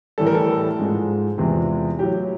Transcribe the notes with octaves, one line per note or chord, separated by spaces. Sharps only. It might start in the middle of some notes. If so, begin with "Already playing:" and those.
A2 E3 G3 A4
A#4
A4
G#2 F3 G#3
E2 C3 F3 G#3 G#4
A2 F#3 G4